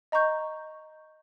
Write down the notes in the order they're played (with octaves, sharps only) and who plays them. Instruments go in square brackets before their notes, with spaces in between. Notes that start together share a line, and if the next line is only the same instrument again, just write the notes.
[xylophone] D#5 A#5 C#6 G6